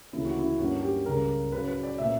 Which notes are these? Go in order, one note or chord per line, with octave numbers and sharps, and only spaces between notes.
D2 C#3 E3 A#3 C#4 E4
F#4
E4
G2 F#3 A#3 C#4 F#4
G4
C#2 C#3 G3 A#4
C#3 F#3 C#4 B4
B4
D5
A#2 A#3 C#4 E5